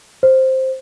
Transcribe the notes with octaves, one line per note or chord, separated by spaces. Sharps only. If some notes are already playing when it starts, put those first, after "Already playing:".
C5